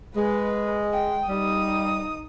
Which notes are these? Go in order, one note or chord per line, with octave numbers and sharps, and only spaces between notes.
G#3 B4
G5
G3 D#4 D#6